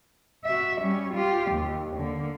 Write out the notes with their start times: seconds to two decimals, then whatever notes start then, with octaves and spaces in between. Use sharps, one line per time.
0.45 F#4 E5
0.81 G3 C#4
1.14 F4 G4
1.51 D#2
1.97 D3 A#3